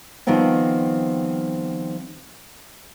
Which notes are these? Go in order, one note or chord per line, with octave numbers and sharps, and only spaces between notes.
D#3 F3 G3 B3 C4